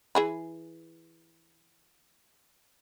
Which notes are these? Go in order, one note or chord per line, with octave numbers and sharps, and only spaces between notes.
E3 G#4 B5